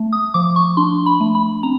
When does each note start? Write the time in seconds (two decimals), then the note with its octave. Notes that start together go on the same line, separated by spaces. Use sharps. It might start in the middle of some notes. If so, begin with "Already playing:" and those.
Already playing: A3
0.13 D#6
0.34 F3 D6
0.56 C#6
0.77 D4 C6
1.06 B5
1.20 A3
1.35 B5
1.63 C4 A#5